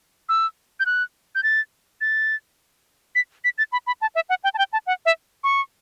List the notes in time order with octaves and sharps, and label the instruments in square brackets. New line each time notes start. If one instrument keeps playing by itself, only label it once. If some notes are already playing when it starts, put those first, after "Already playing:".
[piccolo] E6
G6
F#6
G6
A6
A6
B6
B6
A6
B5
B5
A5
E5
F#5
G5
A5
G5
A5
F#5
E5
C#6